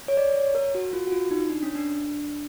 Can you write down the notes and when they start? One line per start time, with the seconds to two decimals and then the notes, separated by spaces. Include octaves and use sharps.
0.08 C#5
0.17 D5
0.36 C#5
0.55 A#4
0.75 F#4
0.93 F4
1.07 F#4
1.12 F4
1.31 D#4
1.49 D4
1.63 C#4
1.75 D4